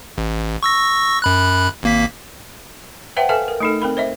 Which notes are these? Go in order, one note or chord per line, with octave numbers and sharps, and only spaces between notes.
A1
C#6 E6 A#6
F#2 B5 F#6
G#1 A#3 B6
B4 C5 E5 F#5 G5 A5
A4 B4 E5 F5 G#5 A5
A#4
A3 D#4 A4
C4 A#4 B5
C5 D#5 E5